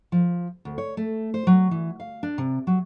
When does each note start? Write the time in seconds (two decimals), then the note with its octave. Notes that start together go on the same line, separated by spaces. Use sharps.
0.12 F3
0.65 D2
0.78 C#5
0.97 A3
1.34 C5
1.47 F#3
1.71 E3
2.00 F5
2.23 D4
2.38 C3
2.67 F#3